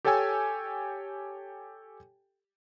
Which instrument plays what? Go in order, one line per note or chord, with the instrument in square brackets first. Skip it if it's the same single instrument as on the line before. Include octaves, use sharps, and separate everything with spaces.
[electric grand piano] G4 A4 C#5 G5 G#5 E6